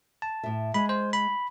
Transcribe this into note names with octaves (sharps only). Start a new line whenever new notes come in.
A5
A2 E5
G#3 B5
C5
B5